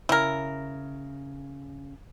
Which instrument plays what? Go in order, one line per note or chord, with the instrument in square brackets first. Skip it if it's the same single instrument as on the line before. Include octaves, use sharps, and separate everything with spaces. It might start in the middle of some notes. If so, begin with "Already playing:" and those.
[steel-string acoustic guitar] C#3 [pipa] E4 A#4